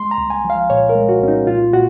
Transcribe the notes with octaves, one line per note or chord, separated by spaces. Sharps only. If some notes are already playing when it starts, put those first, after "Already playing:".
Already playing: G#3 C6
A#5
C2
G#5
F3
F5
A#2 C#5
A#4
G#3
F#4
C2 C#4
D#4
A#2 F4
A#2 F#4